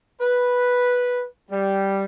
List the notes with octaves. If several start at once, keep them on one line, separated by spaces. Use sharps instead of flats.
B4
G3